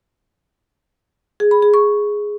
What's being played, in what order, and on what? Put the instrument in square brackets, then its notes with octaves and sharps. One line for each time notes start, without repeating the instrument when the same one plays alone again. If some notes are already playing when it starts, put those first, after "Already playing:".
[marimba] G#4
B5
G#4
C#6